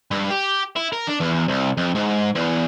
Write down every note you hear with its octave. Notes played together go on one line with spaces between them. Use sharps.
G2
G4
E4
A#4
D4
E2
C2
F2
G#2
E2